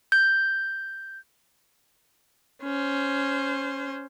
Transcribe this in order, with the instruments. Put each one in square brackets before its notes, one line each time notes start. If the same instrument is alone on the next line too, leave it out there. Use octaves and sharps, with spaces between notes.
[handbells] G6
[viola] C#4 C5